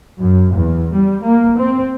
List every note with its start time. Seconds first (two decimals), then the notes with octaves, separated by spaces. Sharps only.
0.19 F#2
0.53 E2
0.96 G3
1.24 A#3
1.58 C4